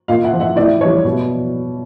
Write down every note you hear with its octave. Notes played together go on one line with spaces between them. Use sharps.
A#2 D#5 F5
E5 F#5
F3
E5 F#5
A2 D5 E5
E3 G3 C#5 D#5
B2